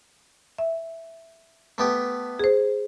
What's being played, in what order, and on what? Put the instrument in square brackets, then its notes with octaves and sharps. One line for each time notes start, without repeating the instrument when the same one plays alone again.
[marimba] E5
[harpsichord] A3 B3 G4
[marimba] G#4 C5